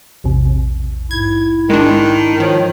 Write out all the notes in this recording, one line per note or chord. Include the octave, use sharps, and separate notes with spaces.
A#1 E2 C3
G#2 E4 G#6
D#3 G#3 D4
D#3 F3 C#5